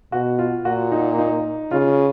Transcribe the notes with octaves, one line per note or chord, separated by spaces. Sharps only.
B2 F#4
F4
A#2 F#4
D#4
D#4
C#3 F4